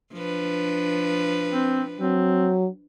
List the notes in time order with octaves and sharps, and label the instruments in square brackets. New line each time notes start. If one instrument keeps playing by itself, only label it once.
[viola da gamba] F3 D4 B4
[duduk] C4
[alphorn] F#3 [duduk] C4